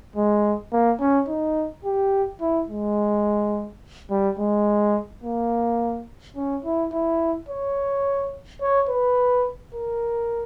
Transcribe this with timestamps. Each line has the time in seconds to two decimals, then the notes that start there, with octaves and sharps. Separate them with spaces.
0.16 G#3
0.72 A#3
1.00 C#4
1.28 D#4
1.85 G4
2.41 E4
2.69 G#3
4.11 G3
4.39 G#3
5.24 A#3
6.36 C#4
6.64 E4
6.93 E4
7.49 C#5
8.62 C#5
8.89 B4
9.75 A#4